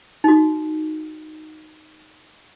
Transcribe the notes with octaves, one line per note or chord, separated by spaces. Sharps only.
D#4 F#4